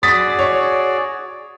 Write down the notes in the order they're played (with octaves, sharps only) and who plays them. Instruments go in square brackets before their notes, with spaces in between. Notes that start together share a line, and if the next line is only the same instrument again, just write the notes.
[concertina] F#4 G#4 D5 [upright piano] D#6 A6 B6
[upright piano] C#5